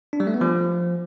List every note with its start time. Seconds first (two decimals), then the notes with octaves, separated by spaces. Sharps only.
0.13 D4
0.20 G3
0.27 A3
0.34 B3
0.41 F3